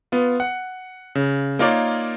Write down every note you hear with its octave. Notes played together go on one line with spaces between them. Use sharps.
B3 F4
F#5
C#3
A#3 D#4 F4 A#4 C#5 D5